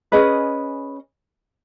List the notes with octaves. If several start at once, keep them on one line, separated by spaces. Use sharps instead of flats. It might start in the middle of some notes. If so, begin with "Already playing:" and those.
C#4 G#4 B4 D#5